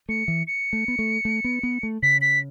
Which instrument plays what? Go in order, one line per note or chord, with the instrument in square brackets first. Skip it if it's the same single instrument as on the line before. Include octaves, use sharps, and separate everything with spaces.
[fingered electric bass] A3 [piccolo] C#7
[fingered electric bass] E3
[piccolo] C#7
[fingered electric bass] A3
B3
A3
A3
B3
B3
A3
[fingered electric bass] C#3 [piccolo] B6
[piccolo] B6